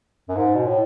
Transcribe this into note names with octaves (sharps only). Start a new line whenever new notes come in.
F#2
G#2
B2
A2